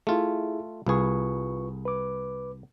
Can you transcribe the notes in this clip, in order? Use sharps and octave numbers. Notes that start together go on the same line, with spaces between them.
A3 E4 F4 G#4
C2 F4 G#4 B4 C#6
B4 D6